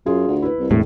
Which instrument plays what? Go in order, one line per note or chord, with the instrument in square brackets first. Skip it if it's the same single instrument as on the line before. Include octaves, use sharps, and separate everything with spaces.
[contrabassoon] F#2 [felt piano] F4 G#4
[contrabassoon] D2
[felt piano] E4 B4
[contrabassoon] C2
[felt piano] E1 [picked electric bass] A2